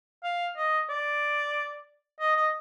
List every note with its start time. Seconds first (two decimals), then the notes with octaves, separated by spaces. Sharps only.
0.24 F5
0.57 D#5
0.90 D5
2.20 D#5
2.37 D#5